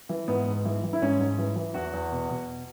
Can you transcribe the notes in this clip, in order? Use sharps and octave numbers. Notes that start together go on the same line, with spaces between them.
E3
G#2 B3
G#2
E3
E3
E4
G#2 C#4
G#2
E3
E3
E2 F#4
E2
B2
B2